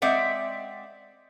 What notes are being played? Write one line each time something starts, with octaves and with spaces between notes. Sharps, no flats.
G#3 C4 D5 E5 F#5